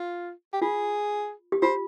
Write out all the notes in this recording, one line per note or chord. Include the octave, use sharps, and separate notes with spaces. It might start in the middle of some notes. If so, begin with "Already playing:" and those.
Already playing: F4
G4
F4 G#4
G4
F4 C5